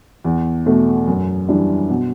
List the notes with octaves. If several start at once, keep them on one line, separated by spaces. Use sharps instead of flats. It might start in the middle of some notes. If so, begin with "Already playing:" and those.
E2
B2 A3
F#2
E3 G3 D4
B2